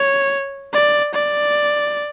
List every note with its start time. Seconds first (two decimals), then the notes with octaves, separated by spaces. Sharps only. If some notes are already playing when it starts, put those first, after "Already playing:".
Already playing: C#5
0.73 D5
1.14 D5